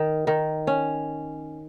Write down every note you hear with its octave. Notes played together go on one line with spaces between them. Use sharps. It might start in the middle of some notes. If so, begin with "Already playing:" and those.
Already playing: D#3
D#3
C#4